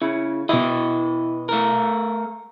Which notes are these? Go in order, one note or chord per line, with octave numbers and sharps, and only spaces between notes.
C#3 E4
B2 E3 E4 D#5
A3 A#4